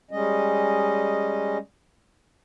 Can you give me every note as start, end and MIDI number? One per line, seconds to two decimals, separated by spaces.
0.11 1.58 55
0.11 1.58 56
0.11 1.58 61
0.11 1.58 75